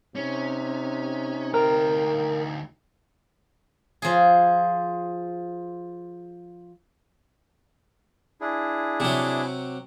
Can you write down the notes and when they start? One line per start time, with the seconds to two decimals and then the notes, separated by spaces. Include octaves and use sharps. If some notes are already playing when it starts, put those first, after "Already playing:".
0.15 C3 C#4 D#4
1.54 D2 A#4 G5
4.02 F3 G#4
8.41 D4 E4 G#4
9.00 C3 F#3